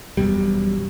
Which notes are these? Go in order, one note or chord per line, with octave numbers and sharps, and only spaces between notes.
E1 F#2 B2 G3